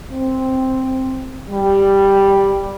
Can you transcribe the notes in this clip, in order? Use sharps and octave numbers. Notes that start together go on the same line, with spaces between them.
C4
G3